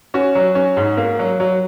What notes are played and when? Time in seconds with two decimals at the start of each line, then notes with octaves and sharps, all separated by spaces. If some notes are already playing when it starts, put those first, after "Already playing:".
0.14 C#4 F#4
0.35 F#3
0.55 C#4
0.77 G#2
0.97 A#3
1.19 F#3
1.40 F#3